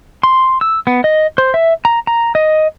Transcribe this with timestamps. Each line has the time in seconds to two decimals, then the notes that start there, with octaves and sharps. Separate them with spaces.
0.23 C6
0.61 E6
0.87 B3
1.04 D#5
1.38 C5
1.54 E5
1.85 A#5
2.07 A#5
2.35 D#5